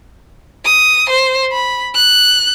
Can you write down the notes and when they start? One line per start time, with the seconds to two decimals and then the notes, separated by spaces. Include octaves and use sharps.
0.65 D#6
1.09 C5
1.52 B5
1.95 F#6